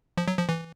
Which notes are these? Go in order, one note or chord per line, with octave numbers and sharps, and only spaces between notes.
F3
F#3
F3
E3